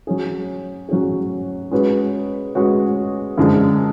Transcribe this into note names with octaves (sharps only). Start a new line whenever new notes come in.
F#3 C#4 G#4
F#3 C#4 G#4
G#3 C#4 F#4 B4
G#3 C#4 F#4 B4
F#2 D3 F3 G#3 D4